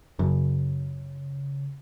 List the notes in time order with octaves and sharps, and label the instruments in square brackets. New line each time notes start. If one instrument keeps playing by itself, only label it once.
[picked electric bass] F#2 [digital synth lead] C#3